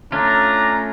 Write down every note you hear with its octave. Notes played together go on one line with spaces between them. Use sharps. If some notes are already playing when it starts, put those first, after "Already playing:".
A3 C#4 D4 F4 A#5